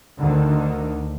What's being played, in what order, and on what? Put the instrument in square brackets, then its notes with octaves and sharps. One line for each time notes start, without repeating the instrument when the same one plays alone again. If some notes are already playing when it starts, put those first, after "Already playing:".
[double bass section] D2 D3 D#3